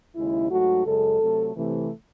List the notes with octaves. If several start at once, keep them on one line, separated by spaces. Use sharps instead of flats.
D#2 C#3 G#3 E4
G#2 F#3 A3 F#4
F#2 C#3 G#3 A4
C3 F#3 A3
C3 E3 A3